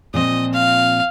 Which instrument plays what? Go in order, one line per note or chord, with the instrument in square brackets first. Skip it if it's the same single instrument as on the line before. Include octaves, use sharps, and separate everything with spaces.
[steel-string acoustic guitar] A#2 F3 C4 [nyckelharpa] D#5
[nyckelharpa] F5